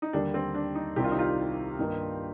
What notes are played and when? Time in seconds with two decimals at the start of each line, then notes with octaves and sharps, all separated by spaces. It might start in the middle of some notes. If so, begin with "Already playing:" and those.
0.02 D#4
0.13 D#2 D3 G3 A#3 D4
0.34 C4
0.54 D4
0.75 D#4
0.96 C2 C3 D#3 G3 C4 G4
1.04 F4
1.12 D#4
1.19 F4
1.79 G2 D#3 A#3 D#4